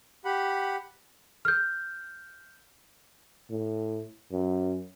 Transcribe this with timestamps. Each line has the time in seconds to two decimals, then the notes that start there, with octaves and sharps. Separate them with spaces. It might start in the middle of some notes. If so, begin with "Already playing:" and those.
0.25 G4 F#5 B5
1.45 F6 G6
3.50 A2
4.32 F#2